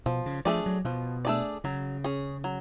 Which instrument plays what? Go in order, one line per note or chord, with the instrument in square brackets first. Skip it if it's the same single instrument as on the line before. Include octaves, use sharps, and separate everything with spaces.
[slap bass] B2 [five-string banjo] F3
[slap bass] C#3
[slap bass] F3 [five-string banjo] A3 D4 G#4 D5
[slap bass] F#3
[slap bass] B2 [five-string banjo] F3
[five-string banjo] A3 D4 G#4 D5
[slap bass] C#3 [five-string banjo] F#3
[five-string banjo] C#4 G#4
F#3